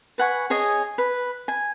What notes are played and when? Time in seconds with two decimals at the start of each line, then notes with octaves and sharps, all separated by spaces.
0.18 B4 F#5 G#5 C#6
0.50 G#4 C#5 D#5 G#5
0.98 B4
1.48 G#5